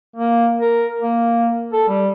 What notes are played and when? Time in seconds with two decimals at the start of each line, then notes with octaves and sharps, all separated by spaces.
0.16 A#3
0.61 A#4
1.02 A#3
1.73 A4
1.88 G3